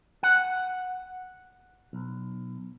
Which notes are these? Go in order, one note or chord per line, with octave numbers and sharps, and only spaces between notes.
F#5
B1